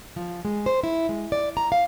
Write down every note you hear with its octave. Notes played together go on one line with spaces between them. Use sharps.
F3
G#3
C5
E4
G#3
D5
A#5
F5